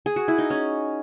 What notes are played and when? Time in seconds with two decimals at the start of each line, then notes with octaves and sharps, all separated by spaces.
0.06 G#4
0.16 F#4
0.28 E4
0.38 D#4
0.50 C#4